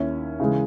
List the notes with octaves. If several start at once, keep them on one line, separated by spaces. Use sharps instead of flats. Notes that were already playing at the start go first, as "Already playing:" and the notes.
Already playing: D#2 D#3 A#3 C#4 E4
C#3 E3 G#3